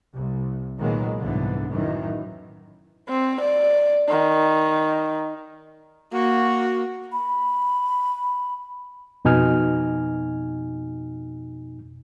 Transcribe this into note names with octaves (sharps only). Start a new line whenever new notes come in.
C2
A#2 D#3 F#3 G#3 A#3 B3
C2 G#2 D3 E3 B3
F#2 A2 D#3 E3
C4
D5
D#3
A#3 F#4
B5
F2 B2 D#4 G#5 F6